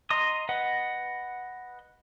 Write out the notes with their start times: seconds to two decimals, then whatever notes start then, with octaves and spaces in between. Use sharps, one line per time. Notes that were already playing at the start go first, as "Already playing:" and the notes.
0.10 D#5 A#5 C6 D#6
0.49 B4 D#5 F#5